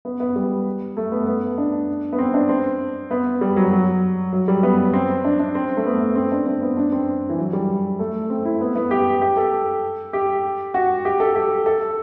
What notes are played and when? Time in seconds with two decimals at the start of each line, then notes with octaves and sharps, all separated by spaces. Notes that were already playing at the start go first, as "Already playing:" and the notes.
0.05 B3
0.20 B3
0.36 G3
0.97 A3
1.12 B3
1.27 B3
1.58 D4
2.13 B3
2.19 C4
2.34 D4
2.49 C4
3.11 B3
3.41 G3
3.56 F#3
3.72 F#3
4.33 F#3
4.48 G3
4.63 B3
4.93 C4
5.24 D4
5.39 D4
5.55 C4
5.77 A3
5.86 B3
6.16 C4
6.31 D4
6.46 C4
6.62 B3
6.77 D4
6.92 C4
7.29 E3
7.38 F#3
7.53 G3
7.99 A3
8.30 C4
8.45 E4
8.61 B3
8.76 B3
8.91 G4
9.22 G4
9.37 A4
10.13 G4
10.74 F#4
11.05 G4
11.20 A4
11.36 G4
11.66 A4